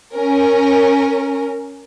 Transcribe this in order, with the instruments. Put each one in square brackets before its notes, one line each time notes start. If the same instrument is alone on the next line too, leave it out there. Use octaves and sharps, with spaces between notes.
[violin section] C#4 A#4